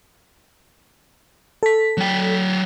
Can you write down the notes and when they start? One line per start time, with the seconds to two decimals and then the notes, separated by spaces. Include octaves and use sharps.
1.63 A4 B6
1.98 F#3 G5